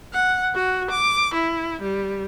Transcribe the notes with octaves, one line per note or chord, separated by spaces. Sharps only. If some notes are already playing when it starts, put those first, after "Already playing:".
F#5
F#4
D6
E4
G3